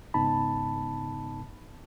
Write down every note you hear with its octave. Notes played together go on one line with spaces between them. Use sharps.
G#2 C#3 B3 D#4 A5 B5